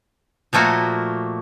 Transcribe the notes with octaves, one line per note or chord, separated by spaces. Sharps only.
A#2 F3 A3 A#3 F#4